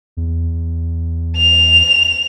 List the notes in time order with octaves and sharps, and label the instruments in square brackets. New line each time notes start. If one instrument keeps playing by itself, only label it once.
[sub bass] E2
[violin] F7